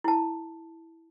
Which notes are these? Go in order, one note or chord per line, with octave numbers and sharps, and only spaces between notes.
E4 A5